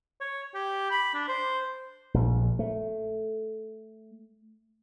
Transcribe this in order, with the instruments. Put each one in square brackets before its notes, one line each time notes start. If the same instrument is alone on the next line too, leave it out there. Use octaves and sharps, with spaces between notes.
[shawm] C#5
G4
B5
D4
C5
[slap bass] A#1
A3